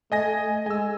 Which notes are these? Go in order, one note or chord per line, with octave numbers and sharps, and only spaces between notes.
A3 D#5 G#5 A#6
G#3 G#5 E6